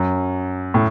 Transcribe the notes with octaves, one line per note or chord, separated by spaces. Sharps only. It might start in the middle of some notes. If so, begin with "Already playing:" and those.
Already playing: F#2
A2